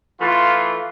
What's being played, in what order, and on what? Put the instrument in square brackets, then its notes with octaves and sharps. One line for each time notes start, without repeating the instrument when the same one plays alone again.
[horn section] E3 A3 F4